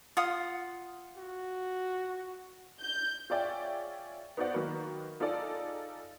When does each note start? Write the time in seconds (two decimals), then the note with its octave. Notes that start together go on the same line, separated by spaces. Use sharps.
0.17 F4 F#5 D#6
1.17 F#4
2.81 G6
3.30 F4 G#4 C#5 D5 E5 G5
4.37 B3 D#4 F#4 C5 D5 F#5
4.54 D#3 F#3 A#3 F#4 B4
5.20 D#4 F4 G#4 A4 D5